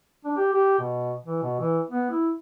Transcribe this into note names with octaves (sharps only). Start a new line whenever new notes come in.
D4
G4
G4
B2
E3
B2
E3
B3
E4